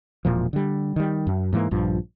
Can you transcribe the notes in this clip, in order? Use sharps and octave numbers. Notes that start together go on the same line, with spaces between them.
E1 A#2 F3
D3 G3
D#3 G3
F#2
G#2 E3 G#3 A#3
A#1 G2 F3